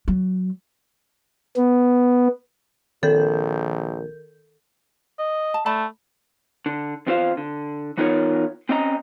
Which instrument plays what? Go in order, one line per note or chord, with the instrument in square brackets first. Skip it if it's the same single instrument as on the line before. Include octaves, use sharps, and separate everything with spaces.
[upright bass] F#3
[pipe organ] B3
[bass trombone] A#1 [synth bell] D#3 A#4 G6 [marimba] A4
[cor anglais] D#5
[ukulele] A5
[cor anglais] A3 [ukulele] D5 A5 B5
[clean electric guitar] D3
E2 B3 C4 F4 C5 F5
D3
E3 B3 D#4 F4 A#4 C#5
C4 C#4 D#5 A#5